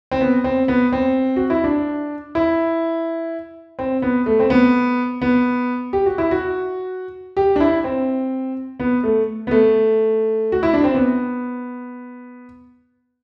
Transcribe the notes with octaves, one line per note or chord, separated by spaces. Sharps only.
C4
B3
C4
B3
C4
F#4
E4
D4
E4
C4
B3
A3
C4
B3
B3
G4
F#4
E4
F#4
G4
D4
E4
C4
B3
A3
B3
A3
F#4
E4
D4
C4
B3